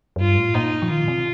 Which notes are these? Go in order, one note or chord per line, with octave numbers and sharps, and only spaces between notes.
F2
G2 F4
A2
A#2 D#4
F3
D#3 F4
A#2
C3